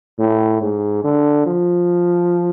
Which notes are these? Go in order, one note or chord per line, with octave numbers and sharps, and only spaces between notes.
A2
G#2
D3
F3